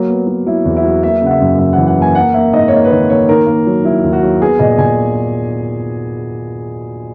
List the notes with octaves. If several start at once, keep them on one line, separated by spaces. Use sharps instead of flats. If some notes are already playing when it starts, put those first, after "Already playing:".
Already playing: F#3 A#3
B3
F#3
F#3 E4
E2 F#4
E4
F#3 F#4
A#3 E5
C#3 F#5
E5
F#2
F#2 E5
E3 F#5
F#5
A#3
G#5
A#3 F#5
A#3 E5
G#2 D#5
C#5
A#3 D#5
B4
D#3 C#5
A#3 C#5
D#3 A#4
A#3
F#3
F#3 E4
D#2
F#4
F#3
B3 G#4
A#2 D#5
A#2 G#5